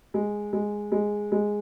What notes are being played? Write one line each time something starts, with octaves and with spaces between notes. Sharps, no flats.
G#3
G#3
G#3
G#3